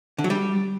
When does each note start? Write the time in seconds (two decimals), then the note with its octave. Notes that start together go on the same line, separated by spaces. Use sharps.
0.18 D3
0.24 F#3
0.30 G3